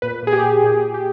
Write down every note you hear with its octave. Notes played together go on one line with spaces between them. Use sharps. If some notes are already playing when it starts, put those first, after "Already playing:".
A#2 B4
A#2 G#4
G4
A#2
A#2 G#4
A#2
G4